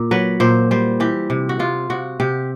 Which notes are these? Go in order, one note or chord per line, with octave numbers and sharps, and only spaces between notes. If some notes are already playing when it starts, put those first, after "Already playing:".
Already playing: A#2
F#3 B4
A#2 C5
G3 C5
E3 G4
C3
F#4
C3 F4
C3 F#4
C3 G4